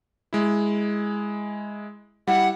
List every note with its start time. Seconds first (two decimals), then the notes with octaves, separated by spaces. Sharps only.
0.33 G#3 E4
2.27 G3 E4 F#5